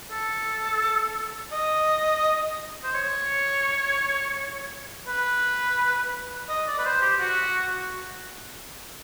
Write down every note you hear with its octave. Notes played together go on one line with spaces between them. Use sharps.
A4
D#5
C5
C#5
B4
D#5
D5
B4
C5
G4
F#4